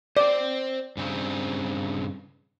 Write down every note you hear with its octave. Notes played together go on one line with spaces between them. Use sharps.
C5 D5 G5
G2 C#3 C4